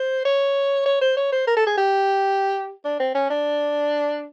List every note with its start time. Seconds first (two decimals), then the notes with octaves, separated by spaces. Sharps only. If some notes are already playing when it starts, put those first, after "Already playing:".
Already playing: C5
0.25 C#5
0.86 C#5
1.01 C5
1.17 C#5
1.32 C5
1.47 A#4
1.57 A4
1.67 G#4
1.77 G4
2.85 D4
3.00 C4
3.15 C#4
3.30 D4